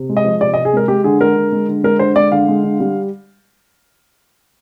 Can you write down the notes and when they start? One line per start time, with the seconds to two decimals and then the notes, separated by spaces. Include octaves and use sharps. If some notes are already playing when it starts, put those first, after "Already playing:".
Already playing: C3
0.09 G#3
0.17 D#5
0.25 F3
0.41 C3 D5
0.54 D#5
0.57 C3
0.65 G#4
0.73 G#3 A#4
0.88 G#3 G4
1.04 D3 G#4
1.20 G#3 A#4
1.37 D3
1.52 G#3
1.69 D3
1.84 G#3 A#4
1.99 D3 C5
2.16 G#3 D5
2.32 D3 F5
2.48 G#3
2.64 D3
2.80 G3